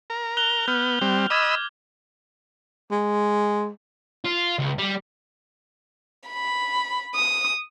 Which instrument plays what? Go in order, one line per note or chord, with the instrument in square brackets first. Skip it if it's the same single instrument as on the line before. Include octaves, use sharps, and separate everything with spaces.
[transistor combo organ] A#4
[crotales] F#6 F7 G7
[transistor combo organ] B3 [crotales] F6 G6
[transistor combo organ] G3 C4
[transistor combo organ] D#5 B5 E6 [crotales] D6 G#6
[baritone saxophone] G#3
[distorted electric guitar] F4
C#2
G3
[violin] B5
D#6